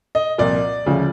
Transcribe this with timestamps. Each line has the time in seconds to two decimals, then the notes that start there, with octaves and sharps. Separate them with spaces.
0.15 D#5
0.38 C2 A#2 F3 D5
0.86 D2 C#3 F3